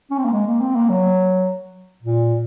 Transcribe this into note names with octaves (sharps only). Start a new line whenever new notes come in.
C#4
C4
A#3
G#3
A#3
C4
A#3
F#3
A#2